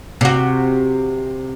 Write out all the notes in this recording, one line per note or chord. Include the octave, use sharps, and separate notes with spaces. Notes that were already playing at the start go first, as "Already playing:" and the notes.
C3 F#4